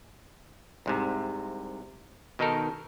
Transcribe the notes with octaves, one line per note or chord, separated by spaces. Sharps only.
C2 G#2 C3
B2 D#3 D#4 A4 A#4